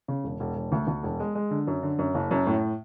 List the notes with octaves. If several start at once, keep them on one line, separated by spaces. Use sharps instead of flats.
C#3
E1
E1
E1
D2
D2
E1
G#3
G#3
D3
F#2
D3
F#2
F#1
F#2
A2